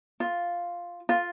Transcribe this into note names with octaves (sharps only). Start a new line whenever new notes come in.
F4
F4